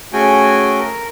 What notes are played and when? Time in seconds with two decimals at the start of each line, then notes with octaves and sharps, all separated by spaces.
0.13 A3 C#4 F#4 G#4 G5 G#5
0.79 A#4